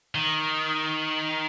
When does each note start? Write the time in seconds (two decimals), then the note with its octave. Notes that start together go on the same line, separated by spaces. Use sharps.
0.15 D#3